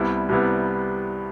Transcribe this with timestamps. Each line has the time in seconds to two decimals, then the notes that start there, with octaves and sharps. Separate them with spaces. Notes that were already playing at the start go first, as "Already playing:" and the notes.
Already playing: C2 C3 G3 B3 E4
0.29 C2 C3 G3 B3 E4